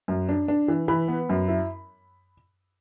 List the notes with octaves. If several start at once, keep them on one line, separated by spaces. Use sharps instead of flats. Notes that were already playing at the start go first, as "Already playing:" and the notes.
F#2
D4
D4
E3
E3 B5
B3
F#2
E4